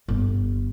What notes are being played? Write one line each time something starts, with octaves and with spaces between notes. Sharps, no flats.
G1